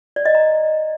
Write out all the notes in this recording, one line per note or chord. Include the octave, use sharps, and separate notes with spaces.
D5
D#5
A#5